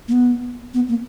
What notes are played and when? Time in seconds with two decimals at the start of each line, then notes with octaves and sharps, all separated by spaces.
0.08 A#3
0.12 B3
0.74 B3
0.89 A#3